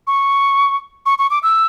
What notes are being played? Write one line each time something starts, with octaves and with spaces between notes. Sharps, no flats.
C#6
C#6
C#6
D6
E6